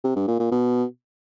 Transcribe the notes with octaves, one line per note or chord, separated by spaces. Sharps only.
C3
G2
A#2
A#2
B2